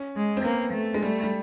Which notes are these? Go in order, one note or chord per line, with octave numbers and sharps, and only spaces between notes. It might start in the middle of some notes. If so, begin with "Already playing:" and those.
Already playing: C#4
G#3
C4
A#3 B3
A3
G#3
G3 A3
G3